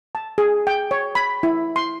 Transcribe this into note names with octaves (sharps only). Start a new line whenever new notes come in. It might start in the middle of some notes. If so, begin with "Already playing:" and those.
A5
G#4
G5
C#5
B5
E4
C6